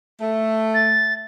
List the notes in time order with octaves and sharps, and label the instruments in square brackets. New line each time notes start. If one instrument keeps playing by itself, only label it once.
[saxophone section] A3
[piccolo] A6